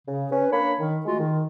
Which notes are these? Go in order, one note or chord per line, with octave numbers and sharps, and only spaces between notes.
C#3
C#4 B4
A#3 D4 C#5 B5
D#3
G#3 A3 F4 F#4
D#3